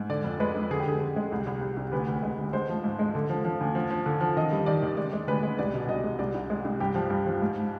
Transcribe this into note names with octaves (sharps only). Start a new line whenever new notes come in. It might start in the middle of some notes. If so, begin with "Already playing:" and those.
Already playing: G#2
D3 D5
F2
G#3 B4
F2
D3 G#4
G4
D3 G#4
D3
G#3
C2
C2
C2
C2
D2 B4
D2
G#3
D2
G#3 C5
F3
G#2
G#3
D3
F3
F3
D2
F3
F3
D3
F3
D#3 D#5
G3
D#3 D5
D#2
G#3 D5
G#3
D2 B4
G#3
C2 D5
B2
C2 D#5
G#3
C2 D5
C2
G#3
C2
G2 G4
F3
G2
F3
G#2